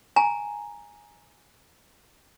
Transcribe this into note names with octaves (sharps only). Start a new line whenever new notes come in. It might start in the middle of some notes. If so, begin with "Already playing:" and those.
G#5 A#5